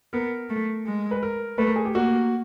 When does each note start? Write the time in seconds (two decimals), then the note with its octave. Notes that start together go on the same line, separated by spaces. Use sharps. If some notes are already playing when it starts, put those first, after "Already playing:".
0.13 B3 A#4
0.50 A3
0.86 G#3
1.11 B4
1.23 A#4
1.58 A3 B4
1.67 A#4
1.76 G#4
1.85 G4
1.94 A#3 F#4